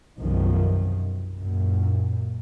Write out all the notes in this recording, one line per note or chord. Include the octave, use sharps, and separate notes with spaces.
B1 F#2 C3 D#3 F3
F#2 A#2